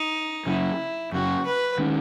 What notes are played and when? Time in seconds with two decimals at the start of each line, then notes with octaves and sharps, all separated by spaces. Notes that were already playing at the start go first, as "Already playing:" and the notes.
Already playing: D#4
0.46 F#2 C#3 F#3 E4
1.12 F#2 C#3 F#3 F#4
1.45 B4
1.78 D#3 G#3 C#4